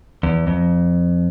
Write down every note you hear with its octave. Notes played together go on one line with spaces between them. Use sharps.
E2
F2